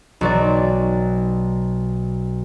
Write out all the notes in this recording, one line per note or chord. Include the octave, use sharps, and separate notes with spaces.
B1 F#3 D5